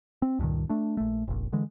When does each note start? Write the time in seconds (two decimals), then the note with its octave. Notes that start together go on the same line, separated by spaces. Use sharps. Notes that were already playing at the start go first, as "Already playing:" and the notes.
0.22 C4
0.39 C#2 G2 A#2 D#3
0.69 A3 D4
0.97 A#1 A3
1.28 F1 A#1
1.53 D3 E3 G#3